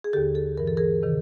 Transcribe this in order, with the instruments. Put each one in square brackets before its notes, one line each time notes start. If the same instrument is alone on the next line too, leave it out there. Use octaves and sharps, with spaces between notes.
[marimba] G#4
D#2 D3 G4 A4
G4 A4
G2 E3 A#4
A4
G#4 A#4
C3 D#3